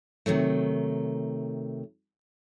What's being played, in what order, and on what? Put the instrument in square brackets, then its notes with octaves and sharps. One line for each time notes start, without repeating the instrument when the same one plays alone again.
[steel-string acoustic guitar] C3 D#3 F#3 A3